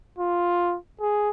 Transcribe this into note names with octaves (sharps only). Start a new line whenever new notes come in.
F4
G#4